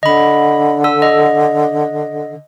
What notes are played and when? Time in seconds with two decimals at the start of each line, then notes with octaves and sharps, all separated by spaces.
0.03 D3 D#5 B5
0.84 A4 E6
1.02 D#5